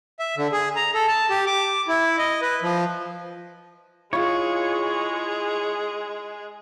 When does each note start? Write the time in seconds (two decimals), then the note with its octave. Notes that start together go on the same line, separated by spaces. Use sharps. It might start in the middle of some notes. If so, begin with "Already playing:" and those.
0.20 E5
0.37 D3
0.52 G#4
0.76 A#5
0.94 A4
1.08 A5
1.30 G4
1.47 D6
1.88 E4
2.18 D#5
2.42 B4
2.62 F3
4.13 G#3 E4 F4 G#4 C#5